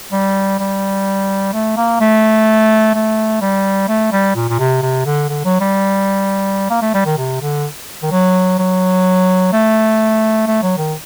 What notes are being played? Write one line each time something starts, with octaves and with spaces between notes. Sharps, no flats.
G3
G3
A3
A#3
A3
A3
G3
A3
G3
A#2
A#2
C3
C3
D3
D3
F#3
G3
A#3
A3
G3
D#3
C3
D3
D#3
F#3
F#3
A3
A3
F#3
D#3